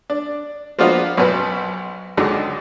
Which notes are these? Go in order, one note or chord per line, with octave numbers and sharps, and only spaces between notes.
D4
F3 A#3 B3 D4 F4 F#4
B1 F#2 F#4 B4
C#2 G#2 D3 F#3 D#4